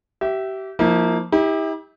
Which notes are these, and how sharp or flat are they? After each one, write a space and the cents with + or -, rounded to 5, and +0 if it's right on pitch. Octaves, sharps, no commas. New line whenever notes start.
G4 -30 E5 +0
F3 +0 A#3 +0 E4 -40
E4 -40 G4 +25